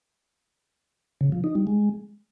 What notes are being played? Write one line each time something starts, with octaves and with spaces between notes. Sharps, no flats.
C#3
F3
D#4
G3
G#3